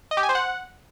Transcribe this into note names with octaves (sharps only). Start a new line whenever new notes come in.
D#5
G4
G#5
C5
F#5